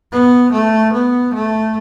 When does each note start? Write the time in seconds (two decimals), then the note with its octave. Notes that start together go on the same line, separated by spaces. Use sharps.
0.12 B3
0.53 A3
0.93 B3
1.34 A3